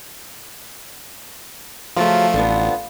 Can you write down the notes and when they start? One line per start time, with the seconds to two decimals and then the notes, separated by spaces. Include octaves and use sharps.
1.97 C#3 F3 F#3 A3 F4 F5 C6
2.34 A1 D3 F3 B3